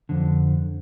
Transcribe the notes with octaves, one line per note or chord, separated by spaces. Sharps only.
F2 D3